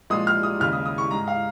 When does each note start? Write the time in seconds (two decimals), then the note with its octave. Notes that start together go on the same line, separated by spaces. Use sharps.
0.10 A#2 F3 G#3 D#6
0.27 F6
0.43 D#6
0.60 D#2 C#3 G#3 F6
0.73 D#6
0.86 D#6
0.98 C#6
1.10 G#2 G#3 A#5
1.28 F5